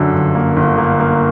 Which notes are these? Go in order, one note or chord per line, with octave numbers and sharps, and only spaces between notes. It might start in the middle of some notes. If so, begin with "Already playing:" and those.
Already playing: F#2 D3
G1
A#3
G1
A#3
A#3